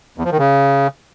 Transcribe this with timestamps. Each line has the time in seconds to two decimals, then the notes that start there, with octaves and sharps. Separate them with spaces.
0.18 E2
0.25 F3
0.32 D#3
0.39 C#3